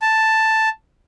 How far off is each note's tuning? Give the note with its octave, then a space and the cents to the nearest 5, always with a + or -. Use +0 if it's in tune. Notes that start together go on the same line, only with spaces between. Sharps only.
A5 +5